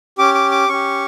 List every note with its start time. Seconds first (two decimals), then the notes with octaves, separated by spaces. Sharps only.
0.18 C#4 G4 D6
0.35 D6
0.51 D6
0.68 C#4 G4 C#6